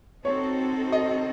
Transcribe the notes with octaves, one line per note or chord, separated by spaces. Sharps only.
C4 D#4 F#4 A4 C#5
D#5